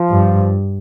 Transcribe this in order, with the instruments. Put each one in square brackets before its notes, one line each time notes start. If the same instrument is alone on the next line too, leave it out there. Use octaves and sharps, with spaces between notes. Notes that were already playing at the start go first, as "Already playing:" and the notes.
Already playing: [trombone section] F3
[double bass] G2